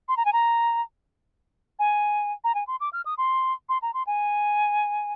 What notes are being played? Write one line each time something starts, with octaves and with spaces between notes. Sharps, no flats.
C6
A#5
G#5
A#5
G#5
A#5
G#5
C6
D6
F6
D#6
C6
C6
A#5
C6
G#5